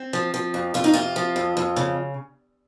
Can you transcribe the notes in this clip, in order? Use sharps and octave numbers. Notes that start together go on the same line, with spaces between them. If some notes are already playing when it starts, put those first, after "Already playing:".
Already playing: C4
F3
F3
F2
F2 F4
D#4
C3 F4
F3
F2
F2
C#3